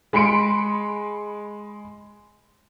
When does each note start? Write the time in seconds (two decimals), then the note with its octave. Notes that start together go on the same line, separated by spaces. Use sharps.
0.13 G#3 B5 C6 C#7 D7